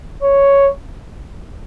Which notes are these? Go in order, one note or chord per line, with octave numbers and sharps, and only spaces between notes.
C#5